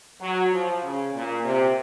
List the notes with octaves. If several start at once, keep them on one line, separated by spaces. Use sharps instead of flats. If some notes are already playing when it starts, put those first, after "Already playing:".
F#3
F3
C#3
A#2
C3